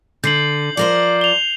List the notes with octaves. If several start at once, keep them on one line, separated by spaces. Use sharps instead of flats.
D3 G6 C7 F#7
F3 A#4 C5 D5
F7 G7